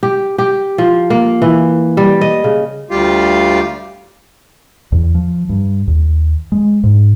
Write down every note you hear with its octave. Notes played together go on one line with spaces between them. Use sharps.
G4
G4
F3
A#3
E3
G3
D#5
C#3
D2 G3 F4 G4 F5
E2
F3
G2
D#2
G#3
G#2